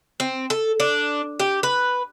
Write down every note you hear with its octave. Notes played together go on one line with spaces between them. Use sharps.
C4
A4
D4
G4
B4